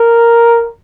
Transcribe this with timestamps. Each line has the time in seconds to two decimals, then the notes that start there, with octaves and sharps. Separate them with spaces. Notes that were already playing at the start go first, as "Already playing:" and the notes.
Already playing: A#4